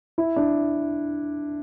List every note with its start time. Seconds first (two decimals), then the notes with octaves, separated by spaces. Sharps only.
0.18 E4
0.36 D4